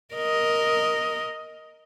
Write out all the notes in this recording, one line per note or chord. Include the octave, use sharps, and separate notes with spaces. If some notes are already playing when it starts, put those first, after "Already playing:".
A#4 D#5